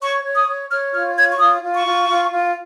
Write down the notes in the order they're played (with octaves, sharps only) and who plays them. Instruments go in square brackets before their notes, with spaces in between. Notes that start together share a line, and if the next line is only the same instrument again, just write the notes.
[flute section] C#5 C#6
C#5
D#6
C#5
C#5 F6
F4 F6
C#5 G#6
C#6
F4 D#6
F4
C#6
F4
F4
F4